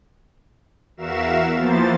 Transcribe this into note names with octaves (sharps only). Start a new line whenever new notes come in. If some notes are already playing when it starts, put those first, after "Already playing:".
E2 F#4 A#4 E5 F5 E7
E3 F3 A#3 B3 C5 A6